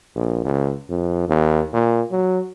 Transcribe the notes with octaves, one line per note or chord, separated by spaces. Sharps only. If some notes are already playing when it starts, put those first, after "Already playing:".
A#1
C#2
F2
D#2
A#2
F#3